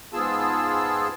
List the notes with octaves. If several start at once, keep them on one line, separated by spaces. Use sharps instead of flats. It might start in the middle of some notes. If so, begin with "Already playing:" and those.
G#2 B3 F4 G#4 A5 E6